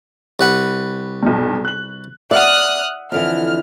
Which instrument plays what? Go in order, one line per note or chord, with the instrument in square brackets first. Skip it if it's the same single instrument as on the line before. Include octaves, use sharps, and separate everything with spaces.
[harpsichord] C2 B4 F#5
[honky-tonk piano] B1 E2 G2
F#6 F#7
[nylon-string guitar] D5 [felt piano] E5 F#5 [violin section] D#6 F6 F#6
[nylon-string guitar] F2 D3 E3 [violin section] F6